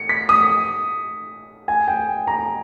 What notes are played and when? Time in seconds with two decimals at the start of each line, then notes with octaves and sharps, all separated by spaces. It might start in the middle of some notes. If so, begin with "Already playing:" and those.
Already playing: C#7
0.09 B6
0.29 D#6
1.68 G#5
1.88 G5
2.27 A#5